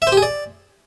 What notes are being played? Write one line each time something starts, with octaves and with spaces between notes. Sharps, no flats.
E5
C5
G4
G#4
D5